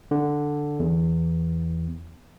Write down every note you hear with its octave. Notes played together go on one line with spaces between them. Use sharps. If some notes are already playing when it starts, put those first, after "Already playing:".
D3
E2